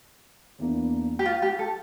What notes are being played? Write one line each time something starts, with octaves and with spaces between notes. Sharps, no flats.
E2 E3 A#3 D4
G4
F4
G4
A4